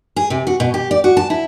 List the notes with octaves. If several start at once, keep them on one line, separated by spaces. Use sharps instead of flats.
G#4
C3
F#4
B2
G4
D5
F#4
A5
E4